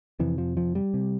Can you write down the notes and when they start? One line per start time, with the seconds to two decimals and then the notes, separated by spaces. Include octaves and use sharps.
0.20 F2 C3 E3
0.38 F3
0.57 F3
0.75 G3
0.94 C3